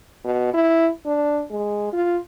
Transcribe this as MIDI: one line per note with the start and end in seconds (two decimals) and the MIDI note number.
0.25 0.52 47
0.54 0.89 64
1.06 1.44 62
1.51 1.90 56
1.93 2.17 65